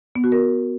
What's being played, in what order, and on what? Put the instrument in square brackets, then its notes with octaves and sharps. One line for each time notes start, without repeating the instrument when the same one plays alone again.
[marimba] B3
F#4
A#4